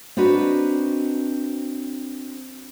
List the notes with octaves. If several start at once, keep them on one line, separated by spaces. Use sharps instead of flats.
C4 D4 D#4 F#4 B4